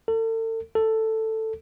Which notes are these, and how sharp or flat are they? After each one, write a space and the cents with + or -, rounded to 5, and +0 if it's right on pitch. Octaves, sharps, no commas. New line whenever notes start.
A4 +40
A4 +10